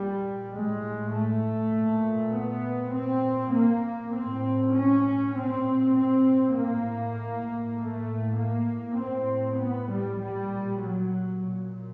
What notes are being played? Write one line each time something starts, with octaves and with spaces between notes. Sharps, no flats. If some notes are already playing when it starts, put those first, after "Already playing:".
Already playing: A#2 G3
A2 G#3
A3
A#2
B3
A#2 C4
A#3
A2 C4
C#4
A#2 C4
C4
A2 A#3
A2 A3
A#3
A2 C4
B3
G3
A#2 G3
F#3
A#2